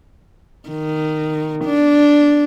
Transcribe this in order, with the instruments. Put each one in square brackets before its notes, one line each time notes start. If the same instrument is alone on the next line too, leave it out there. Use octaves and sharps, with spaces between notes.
[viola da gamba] D#3
D4